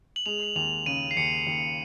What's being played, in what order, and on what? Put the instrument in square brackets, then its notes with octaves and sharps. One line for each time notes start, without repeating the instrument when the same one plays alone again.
[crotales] F#7
[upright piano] G#3 [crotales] F7
[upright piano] D#2 [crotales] F7
[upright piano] C#3 [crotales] D#7
[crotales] C7
[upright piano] D#2 [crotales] C#7
[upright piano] D#2